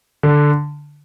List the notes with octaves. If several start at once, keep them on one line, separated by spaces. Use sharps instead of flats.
D3